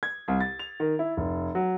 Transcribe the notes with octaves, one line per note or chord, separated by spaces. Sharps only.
G#6
C2
A6
F7
D#3
E4
F1
F#3